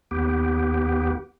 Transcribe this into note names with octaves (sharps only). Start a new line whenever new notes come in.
D#2 B3 G4